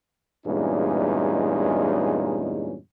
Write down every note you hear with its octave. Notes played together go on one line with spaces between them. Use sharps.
E2 G2 A#2 G#3 C#4 D#4